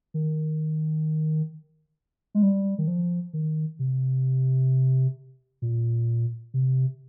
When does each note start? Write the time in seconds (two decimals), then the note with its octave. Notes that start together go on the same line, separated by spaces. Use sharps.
0.14 D#3
2.35 G#3
2.43 G3
2.78 D#3
2.88 F3
3.33 D#3
3.79 C3
5.62 A#2
6.54 C3